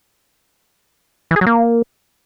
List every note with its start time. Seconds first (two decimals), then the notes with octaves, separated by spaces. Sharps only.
1.31 E3
1.36 G#4
1.41 F#3
1.47 A#3